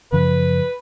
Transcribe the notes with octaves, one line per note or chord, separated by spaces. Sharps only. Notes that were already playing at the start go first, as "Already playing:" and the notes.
F#2 C#3 F3 B4